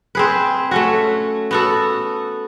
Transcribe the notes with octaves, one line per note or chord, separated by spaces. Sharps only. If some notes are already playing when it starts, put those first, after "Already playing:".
C4 G#4 B4
A3 C#4 F#4
B3 F#4 A4